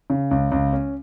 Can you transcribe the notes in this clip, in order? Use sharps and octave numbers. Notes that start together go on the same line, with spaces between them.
C#3
C#2
C#2
C#4